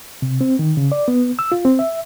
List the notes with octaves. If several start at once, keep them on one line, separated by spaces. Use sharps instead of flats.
C3
C4
D#3
C#3
D5
B3
E6
F4
C4
E5